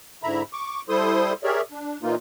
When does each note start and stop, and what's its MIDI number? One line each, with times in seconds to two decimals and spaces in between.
0.23 0.42 44
0.23 0.42 50
0.23 0.42 64
0.23 0.42 76
0.23 0.42 82
0.23 0.42 83
0.53 0.81 85
0.53 0.81 86
0.89 1.33 55
0.89 1.33 64
0.89 1.33 69
0.89 1.33 72
0.89 1.33 84
0.89 1.33 87
1.44 1.61 67
1.44 1.61 68
1.44 1.61 70
1.44 1.61 73
1.44 1.61 74
1.44 1.61 76
1.72 1.98 62
2.03 2.15 46
2.03 2.15 52
2.03 2.15 58
2.03 2.15 63
2.03 2.15 65